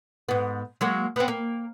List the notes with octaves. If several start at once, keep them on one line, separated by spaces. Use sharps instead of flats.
G#2 B3
F#3 G#3 A#3
B3 C4
A#3